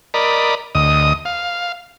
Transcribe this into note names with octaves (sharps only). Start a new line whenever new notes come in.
A#4 D5 D#5 B5
D2 D#5 D#6
F5